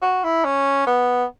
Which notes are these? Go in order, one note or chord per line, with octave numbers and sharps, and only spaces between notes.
F#4
E4
C#4
B3